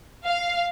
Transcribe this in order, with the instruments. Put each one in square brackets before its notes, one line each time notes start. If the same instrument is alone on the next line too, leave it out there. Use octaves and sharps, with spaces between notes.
[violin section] F5